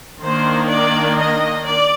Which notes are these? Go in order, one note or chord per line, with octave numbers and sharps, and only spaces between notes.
D#3 A#3 D4 C5
D5
D#5
D5